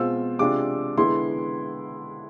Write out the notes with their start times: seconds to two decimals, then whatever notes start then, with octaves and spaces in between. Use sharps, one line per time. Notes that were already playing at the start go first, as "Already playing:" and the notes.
Already playing: B2 G#3 C4 F4 E6
0.39 C3 G#3 D4 F4 D6
0.97 D3 G#3 B3 E4 C6